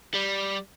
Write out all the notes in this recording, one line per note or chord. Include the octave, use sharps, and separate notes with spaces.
G3